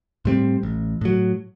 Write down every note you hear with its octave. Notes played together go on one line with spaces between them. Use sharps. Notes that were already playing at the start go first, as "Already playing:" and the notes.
A2 G3 C4
A1
A2 F#3